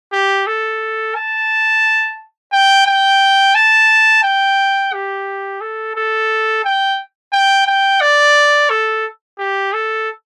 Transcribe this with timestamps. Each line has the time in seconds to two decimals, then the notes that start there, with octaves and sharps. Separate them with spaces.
0.12 G4
0.47 A4
1.16 A5
2.53 G5
2.87 G5
3.55 A5
4.23 G5
4.93 G4
5.61 A4
5.96 A4
6.65 G5
7.33 G5
7.67 G5
8.01 D5
8.70 A4
9.39 G4
9.73 A4